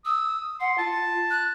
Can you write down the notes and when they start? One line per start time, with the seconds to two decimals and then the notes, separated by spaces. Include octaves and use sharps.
0.05 D#6 E6
0.60 F#5 C6
0.78 F4 A5
1.30 F#6